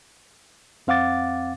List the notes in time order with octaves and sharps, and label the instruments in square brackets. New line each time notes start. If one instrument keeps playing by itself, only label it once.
[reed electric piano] F2 C4 F5 F#5 D6 A6